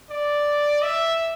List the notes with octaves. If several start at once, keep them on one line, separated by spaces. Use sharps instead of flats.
D5
E5